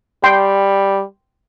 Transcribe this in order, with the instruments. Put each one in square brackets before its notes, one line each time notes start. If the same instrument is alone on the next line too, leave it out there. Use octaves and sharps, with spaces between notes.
[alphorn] G3 [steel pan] G5 C6